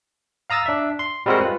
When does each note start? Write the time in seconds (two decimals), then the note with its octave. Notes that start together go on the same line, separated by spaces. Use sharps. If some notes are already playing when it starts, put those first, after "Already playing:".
0.50 F5 A#5 D#6 E6 A6
0.66 D4 E5
0.99 C6
1.26 G3 G#3 C4 F#4 A#4 F#5
1.41 F4 B4